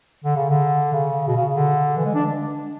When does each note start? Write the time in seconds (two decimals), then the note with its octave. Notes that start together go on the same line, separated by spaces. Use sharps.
0.24 D3
0.36 C#3
0.49 D3
0.92 C#3
1.27 B2
1.36 C#3
1.53 D3
1.97 E3
2.05 G#3
2.14 D4